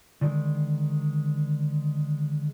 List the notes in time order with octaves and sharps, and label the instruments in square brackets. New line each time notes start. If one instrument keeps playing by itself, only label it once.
[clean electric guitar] D3 D#3 G#3